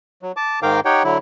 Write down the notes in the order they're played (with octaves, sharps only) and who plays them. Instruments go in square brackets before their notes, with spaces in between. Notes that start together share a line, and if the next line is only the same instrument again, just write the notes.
[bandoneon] F#3
A5 D6
G#2 D#3 A#4 F5 G5 D6
D#4 G4 C#5 F#5 G5
D3 F#3 E4